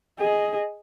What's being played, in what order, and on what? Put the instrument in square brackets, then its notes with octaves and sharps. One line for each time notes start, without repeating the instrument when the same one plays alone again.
[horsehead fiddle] G#4 D#5